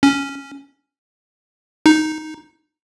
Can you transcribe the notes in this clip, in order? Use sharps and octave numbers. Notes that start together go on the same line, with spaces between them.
C#4
D#4